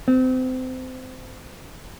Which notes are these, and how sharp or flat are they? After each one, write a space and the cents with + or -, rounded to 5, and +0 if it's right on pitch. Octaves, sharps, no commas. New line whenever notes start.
C4 -30